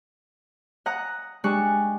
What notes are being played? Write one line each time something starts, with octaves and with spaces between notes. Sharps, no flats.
F#5 A#5 D#6 F#6
G#3 D4 G4 C#6 F#6